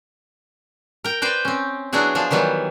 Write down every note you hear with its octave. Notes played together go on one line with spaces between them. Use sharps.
A#4 G5
B4 C5 D5 G5
C4 C#4
F#3 B3 D4 E4 F#4 G#4
F3 D4 G#4
D#3 E3 F#3 G3 B3